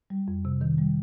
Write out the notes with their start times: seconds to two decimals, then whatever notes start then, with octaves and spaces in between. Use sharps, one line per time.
0.10 G3
0.28 F2
0.45 C3
0.61 D#3
0.78 G3